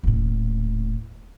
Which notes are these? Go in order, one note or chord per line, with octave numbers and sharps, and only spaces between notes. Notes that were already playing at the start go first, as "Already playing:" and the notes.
D#1 A2